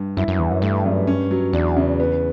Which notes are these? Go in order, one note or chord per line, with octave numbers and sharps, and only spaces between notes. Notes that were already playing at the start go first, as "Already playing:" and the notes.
Already playing: G2
F#2 E4
F#2
E2 E3
F#2
G2 A3
F#2
C#4
F#3
E2 D4
C#3
B3